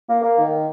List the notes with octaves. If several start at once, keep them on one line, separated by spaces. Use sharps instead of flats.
A#3
A#3
D#3